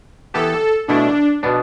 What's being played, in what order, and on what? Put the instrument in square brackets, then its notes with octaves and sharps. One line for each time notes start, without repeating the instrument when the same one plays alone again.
[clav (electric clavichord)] E3 B3 G4 [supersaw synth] A4
[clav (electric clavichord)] B2 A3 E4 [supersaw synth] D4
[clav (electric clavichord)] B2 B3 D4